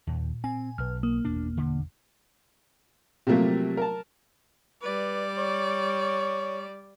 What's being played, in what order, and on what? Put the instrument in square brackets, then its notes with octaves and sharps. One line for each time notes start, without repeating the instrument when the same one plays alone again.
[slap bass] D#2 [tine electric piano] A#2
[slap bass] C4 [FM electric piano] G#5
[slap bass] B1 [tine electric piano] B4 F6
[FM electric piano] A#3 [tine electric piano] D#6
[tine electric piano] G#1 E2 B2 [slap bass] D4
[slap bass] D3
[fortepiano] C3 F3 F#3 A3 A#3 G4
A#4 A5
[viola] G3 D5 [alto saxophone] B4
[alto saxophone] C#5